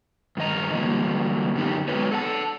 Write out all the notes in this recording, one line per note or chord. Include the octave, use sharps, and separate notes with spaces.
G2 D#3 D#5 A#5
D3 E3 F#3 G3 A#3
F#2 D3 B3 D#4 G4
G#3 B3 F#4 B4 C#5
A4 F#5 A5